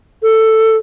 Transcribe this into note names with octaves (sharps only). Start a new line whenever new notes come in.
A4